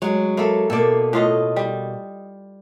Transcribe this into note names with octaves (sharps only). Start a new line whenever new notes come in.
F#3 G#3 C#5
A#3 E4 A4
B2 A#3 A4 D5
A2 F4 D#5
G3